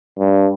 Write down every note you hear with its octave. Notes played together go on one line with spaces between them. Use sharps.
G2